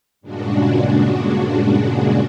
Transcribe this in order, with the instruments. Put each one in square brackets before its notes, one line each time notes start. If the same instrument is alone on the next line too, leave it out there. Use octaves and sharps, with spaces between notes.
[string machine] G2 A#2 C#3 G#3 D4 F#4